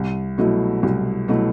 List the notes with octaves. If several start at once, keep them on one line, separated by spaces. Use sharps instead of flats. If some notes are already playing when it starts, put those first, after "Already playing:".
Already playing: C2
B2 F#3 A3 E4
C2
B2 F#3 A3 E4